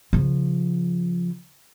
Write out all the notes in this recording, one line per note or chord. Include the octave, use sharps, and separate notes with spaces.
C#3 F3